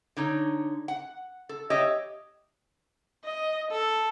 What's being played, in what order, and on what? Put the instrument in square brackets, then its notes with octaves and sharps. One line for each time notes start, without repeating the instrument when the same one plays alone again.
[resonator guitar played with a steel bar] D3 D#4 C#5
F#5
A4
[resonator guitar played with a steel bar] G4 C#5 E5 [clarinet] D#5
[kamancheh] D#5
A4